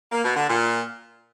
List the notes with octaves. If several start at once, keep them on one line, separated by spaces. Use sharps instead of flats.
A#3
B2
D3
A#2